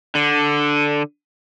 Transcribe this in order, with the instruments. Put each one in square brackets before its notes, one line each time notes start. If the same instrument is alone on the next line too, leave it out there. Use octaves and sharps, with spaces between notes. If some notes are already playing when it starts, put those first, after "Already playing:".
[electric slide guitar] D3